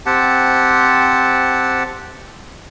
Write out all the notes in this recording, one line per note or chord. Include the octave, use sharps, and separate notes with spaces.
C4 G4 F#5 A5